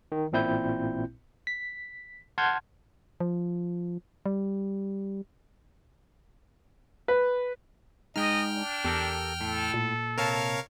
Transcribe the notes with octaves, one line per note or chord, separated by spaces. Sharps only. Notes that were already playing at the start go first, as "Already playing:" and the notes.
D#3
A1 A#2 C4 E4 G6
B6
F#5 A5 C6 F6 G6 G#6
F3
G3
B4
G#3 D#4 D#5 G5 F6
D4
E2 G4 A4 A#4
A2 A4
A#2
C3 A#4 C#5 F5 A5